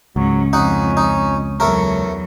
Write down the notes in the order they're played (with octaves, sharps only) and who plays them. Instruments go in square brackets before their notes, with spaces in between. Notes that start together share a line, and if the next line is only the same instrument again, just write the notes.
[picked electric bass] C#2 [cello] G#2 C#4 [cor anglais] F#3
[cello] F2 [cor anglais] C#4 [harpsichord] D#4 F#5
[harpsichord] D#4
[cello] E2 F#3 [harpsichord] A3 A#4 [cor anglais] C#5